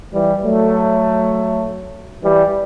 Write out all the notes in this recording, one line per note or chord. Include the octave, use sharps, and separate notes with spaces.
E3 G3
F#3 A3
E3 G3